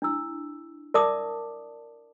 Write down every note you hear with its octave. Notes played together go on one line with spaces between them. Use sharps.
D4 E4 E6
A#4 D5 E5 A5 D6 D#6